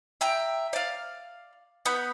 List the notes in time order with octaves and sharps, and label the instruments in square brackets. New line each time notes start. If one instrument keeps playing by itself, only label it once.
[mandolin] E5 G5 A#5
D5 F5
B3 F#5 B5 G6